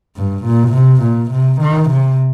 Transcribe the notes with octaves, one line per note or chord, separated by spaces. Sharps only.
G2
A#2
C3
A#2
C3
D#3
C3